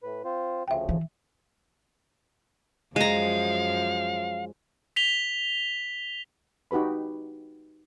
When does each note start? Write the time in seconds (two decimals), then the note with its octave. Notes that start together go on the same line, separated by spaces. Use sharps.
0.03 A2 B4
0.25 C4 F4 C5
0.68 D2 C#3 F3 E5 G5
0.89 E3
2.96 F#2 F3 G#3 F5 A#5
4.96 B6 F7 G7
6.71 D#4 F#4 G4 B4 B5